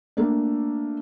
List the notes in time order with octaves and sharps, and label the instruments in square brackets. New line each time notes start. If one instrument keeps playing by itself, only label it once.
[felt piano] A3 A#3 D4